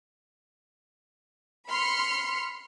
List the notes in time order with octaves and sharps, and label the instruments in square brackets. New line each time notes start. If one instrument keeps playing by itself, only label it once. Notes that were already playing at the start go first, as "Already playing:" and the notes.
[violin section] B5 C6 F6 C#7